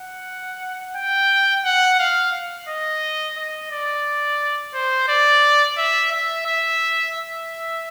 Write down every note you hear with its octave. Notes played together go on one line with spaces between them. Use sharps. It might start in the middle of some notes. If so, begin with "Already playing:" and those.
Already playing: F#5
G5
F#5
F5
D#5
D#5
D5
C5
D5
E5
E5
E5
E5